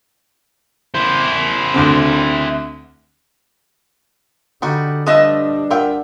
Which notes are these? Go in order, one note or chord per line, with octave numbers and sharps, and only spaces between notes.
E4 C5
D2 D3 C4
D3 G3 D#4 F#4
F3 G3 A3 D4 B4 D#5 E5 D#6
F4 A#4 E5 F#5 G5